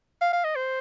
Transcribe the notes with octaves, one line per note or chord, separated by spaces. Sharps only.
F5
F5
D#5
C5